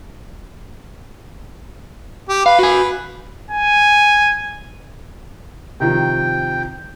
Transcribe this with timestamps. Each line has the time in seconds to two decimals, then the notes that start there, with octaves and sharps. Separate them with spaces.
2.29 G4
2.46 B4 F5
2.59 F#4 G#5
3.51 G#5
5.80 C3 D#3 F3 G5